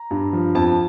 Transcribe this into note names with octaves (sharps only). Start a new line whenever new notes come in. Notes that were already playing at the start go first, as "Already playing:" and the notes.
Already playing: A#5
G2
F3
F2 A5